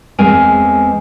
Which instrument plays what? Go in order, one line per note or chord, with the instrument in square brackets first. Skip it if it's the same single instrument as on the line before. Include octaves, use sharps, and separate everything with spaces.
[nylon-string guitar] E2 G#3 C4 A#4 G#5